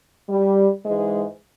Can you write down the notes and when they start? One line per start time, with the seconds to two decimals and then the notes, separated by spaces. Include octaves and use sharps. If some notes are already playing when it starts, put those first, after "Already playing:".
0.29 G3
0.84 G#2 E3 G#3